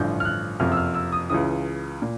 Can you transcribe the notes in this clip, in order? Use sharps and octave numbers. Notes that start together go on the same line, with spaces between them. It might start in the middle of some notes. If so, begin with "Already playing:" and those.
Already playing: A1 G2 D3 F3 G6
F6
F#6
F#1 F2 C3 F6
E6
F6
E6
D#6
C#2 C#3 E3 D#6
A#2